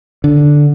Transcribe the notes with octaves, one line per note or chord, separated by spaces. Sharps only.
D3